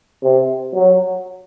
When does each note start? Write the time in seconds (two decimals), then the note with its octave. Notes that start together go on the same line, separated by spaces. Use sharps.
0.22 C3
0.75 F#3